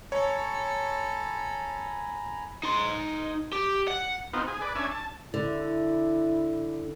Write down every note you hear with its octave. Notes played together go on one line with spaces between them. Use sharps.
A4 C#5 G#5 A#5 B5
D#4 C6
G4
F#5
B3 C4 D#4 F4
G#4
B4 D5
C#4 D4 E5 G#5
A5
D3 E4